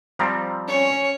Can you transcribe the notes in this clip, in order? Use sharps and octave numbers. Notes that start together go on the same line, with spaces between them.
F3 G3 C4 F5 A#5
C#4 C#5